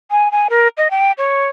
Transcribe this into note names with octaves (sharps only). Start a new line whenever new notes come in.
G#5
G#5
A#4
D#5
G5
C#5